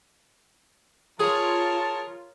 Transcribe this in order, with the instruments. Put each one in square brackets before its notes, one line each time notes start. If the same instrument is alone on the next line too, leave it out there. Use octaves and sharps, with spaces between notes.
[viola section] F4 [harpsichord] G#4 [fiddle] A#4 C#5 [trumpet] A5